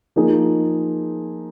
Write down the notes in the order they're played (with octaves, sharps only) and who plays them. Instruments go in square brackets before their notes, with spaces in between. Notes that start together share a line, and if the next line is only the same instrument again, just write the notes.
[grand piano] F3 A#3 D#4 G#4